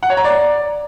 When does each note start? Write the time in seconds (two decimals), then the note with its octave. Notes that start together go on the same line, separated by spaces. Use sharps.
0.03 F#5
0.10 C#5
0.17 A#5
0.24 D5